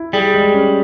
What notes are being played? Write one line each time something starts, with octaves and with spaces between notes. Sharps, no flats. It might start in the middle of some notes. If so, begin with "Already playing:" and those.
Already playing: E4
G3 G#4
G#3
C#4